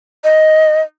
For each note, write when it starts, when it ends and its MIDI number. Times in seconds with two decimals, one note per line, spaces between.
0.24 0.82 75